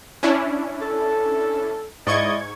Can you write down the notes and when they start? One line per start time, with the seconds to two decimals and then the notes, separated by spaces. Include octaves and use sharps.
0.23 C#4 D4 E4
0.81 A4
2.07 G#2 E4 D5 D#5 C#6 G#6